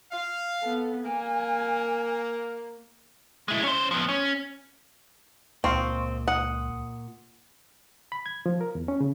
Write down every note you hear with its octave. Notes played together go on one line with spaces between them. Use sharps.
F5
B3 A4
A#3 G#5
G#3 E4
C#4 C5
F3 B3
C#4
C#2 A#2 C4 D#5 F5 C6 C#6
F#5 D#6
B5
G#6
F3
A#4
E2
C#4
C#3